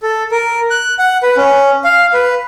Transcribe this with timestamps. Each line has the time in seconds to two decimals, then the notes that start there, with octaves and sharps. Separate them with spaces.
0.02 A4
0.31 A#4
0.70 F#6
0.99 F#5
1.23 B4
1.37 C#4
1.84 F5
2.14 B4